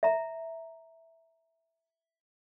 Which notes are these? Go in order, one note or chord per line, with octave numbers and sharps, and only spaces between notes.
E5 A#5